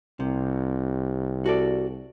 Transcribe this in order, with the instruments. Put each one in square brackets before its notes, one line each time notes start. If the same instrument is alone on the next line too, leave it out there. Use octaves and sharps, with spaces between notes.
[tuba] C2 [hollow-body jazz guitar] C3
[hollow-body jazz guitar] F#4 A4 D5